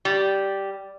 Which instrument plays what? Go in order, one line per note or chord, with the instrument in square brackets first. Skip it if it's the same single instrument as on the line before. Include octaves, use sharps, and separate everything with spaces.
[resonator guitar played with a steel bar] G3